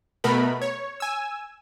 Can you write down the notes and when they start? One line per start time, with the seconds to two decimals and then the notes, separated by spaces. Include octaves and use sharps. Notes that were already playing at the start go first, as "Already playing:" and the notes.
0.24 B2 A3 B3 A#4 B5
0.62 C#5
1.00 G#5 E6